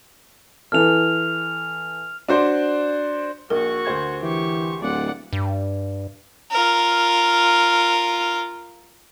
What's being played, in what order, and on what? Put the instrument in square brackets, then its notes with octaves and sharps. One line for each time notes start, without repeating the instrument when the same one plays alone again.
[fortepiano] E3 A4 [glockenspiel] F6 F7
[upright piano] D4 F#4 C5 D5
[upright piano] A#1 [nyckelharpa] F#4 C#6 [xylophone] A#4
[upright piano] D2 C5 G#6
[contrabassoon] E3 [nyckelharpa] G4 C#6
[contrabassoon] D1 [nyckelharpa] D5 F#5
[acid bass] G2
[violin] F4 A#4